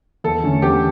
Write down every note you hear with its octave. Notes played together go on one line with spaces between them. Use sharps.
E2 A4
D3 A3 C#4
E2 G4